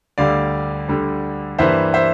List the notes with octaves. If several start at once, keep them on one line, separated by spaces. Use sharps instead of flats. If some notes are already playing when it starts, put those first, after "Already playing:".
D2 D3 G3 D5 F5
D2 D3 G3
G2 E3 A#3 C5 E5
C5 E5